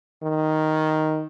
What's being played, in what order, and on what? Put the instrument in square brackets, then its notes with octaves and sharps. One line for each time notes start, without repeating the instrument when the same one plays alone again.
[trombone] D#3